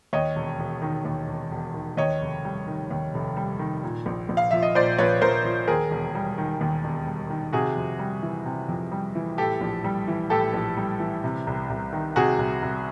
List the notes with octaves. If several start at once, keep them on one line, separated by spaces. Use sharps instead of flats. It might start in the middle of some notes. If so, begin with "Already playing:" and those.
D#2 C#5 D#5
E1
E1
D#3
D#2
E1
E1
D#3
D#2 C#5 D#5
F1
G3
D#3
D#2
F1
G3
D#3
A#2
A#1
A#1
F5
F3 E5
D#5
A#2 C5 D5
A#1 B4 C#5
A#1 A#4 C5
F3
D#2 G#4 A#4
E1
G3
D#3
D#2
E1
G3
D#3
C3 F#4 G#4
F2
G3
E3
C3
F2
G3
E3
A2 G4 A4
A#1
G3
E3
A2 G4 A4
A#1
G3
E3
C3
C2
C2
D#3
C3 F#4 G#4
C2
C2